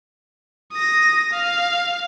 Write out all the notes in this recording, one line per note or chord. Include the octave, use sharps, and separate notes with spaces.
D#6 A#6
F5